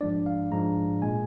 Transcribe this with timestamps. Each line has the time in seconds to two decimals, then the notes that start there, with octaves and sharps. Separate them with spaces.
0.01 G#2 F3 G#3 D4 D5
0.26 F5
0.51 G#2 F3 G#3 D4 A#5
1.02 A#2 G#3 G#5